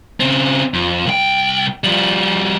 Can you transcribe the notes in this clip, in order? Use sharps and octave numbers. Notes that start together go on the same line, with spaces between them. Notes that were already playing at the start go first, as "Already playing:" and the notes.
C#3 C4
F2
C2 G5
F3 G3